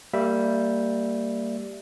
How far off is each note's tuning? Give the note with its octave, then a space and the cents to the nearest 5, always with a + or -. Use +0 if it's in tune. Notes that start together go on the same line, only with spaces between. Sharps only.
G3 +0 A#3 -20 E5 +0